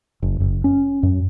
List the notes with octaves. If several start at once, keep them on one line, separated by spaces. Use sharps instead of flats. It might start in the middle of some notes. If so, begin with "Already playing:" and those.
F#1
F#1
C#4
F#2